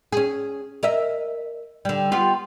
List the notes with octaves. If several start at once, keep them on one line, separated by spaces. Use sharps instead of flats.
C#4 G#4
A#4 D#5 E5
D3 G3
B3 F4 G4